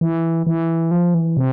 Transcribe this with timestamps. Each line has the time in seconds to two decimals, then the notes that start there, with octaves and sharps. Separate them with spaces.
0.01 E3
0.47 E3
0.91 F3
1.14 E3
1.37 C3